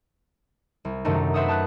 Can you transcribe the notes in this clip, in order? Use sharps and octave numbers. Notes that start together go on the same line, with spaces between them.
C2
F#2 C3 D#3 A3 D4 D#4
B4 C5 E5 F#5 D#6
A5 D#6 F#6